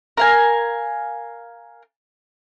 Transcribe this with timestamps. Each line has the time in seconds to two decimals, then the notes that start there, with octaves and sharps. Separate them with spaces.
0.17 A#4 F5 G#5